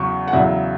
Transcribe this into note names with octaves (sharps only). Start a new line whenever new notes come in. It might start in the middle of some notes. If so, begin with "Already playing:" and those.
Already playing: E2 C#3 F#3 C#6
F#5
E2 C#3 F#3 E5